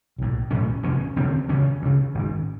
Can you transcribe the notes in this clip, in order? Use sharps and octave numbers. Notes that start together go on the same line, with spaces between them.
B1 A2
B1 A2 C#4
F1 D#2 D3 C#4
F1 D#2 D3 C4
D2 C#3 C#4
D2 C#3
G#1 G#2